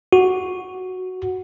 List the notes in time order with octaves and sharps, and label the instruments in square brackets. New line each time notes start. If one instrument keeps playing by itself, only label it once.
[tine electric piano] F#4